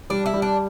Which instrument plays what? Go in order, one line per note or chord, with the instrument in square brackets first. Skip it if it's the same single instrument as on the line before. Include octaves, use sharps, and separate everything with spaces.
[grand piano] G3 [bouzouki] D4
[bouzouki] E4
[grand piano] G3
[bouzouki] D4